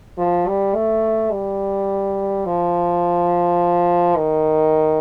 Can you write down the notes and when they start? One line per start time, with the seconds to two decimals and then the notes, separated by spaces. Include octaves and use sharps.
0.18 F3
0.48 G3
0.75 A3
1.32 G3
2.46 F3
4.17 D#3